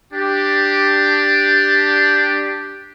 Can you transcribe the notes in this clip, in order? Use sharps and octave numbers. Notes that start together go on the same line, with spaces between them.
D4 G4